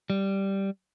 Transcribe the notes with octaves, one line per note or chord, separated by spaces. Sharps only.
G3